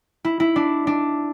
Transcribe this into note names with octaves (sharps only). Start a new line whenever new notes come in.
E4
E4
D4
D4